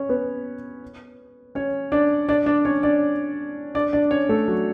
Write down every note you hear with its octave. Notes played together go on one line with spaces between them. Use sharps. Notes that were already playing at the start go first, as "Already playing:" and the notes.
Already playing: C#4 C#5
B3 B4
C#4 C#5
D4 D5
D4 D5
D4 D5
C#4 C#5
D4 D5
D4 D5
D4 D5
C#4 C#5
A3 A4
F#3 F#4